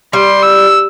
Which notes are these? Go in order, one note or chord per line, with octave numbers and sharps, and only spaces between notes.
G3 C6
E6